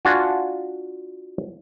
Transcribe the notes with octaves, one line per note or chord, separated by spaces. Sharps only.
D4 F4 F#4 G#5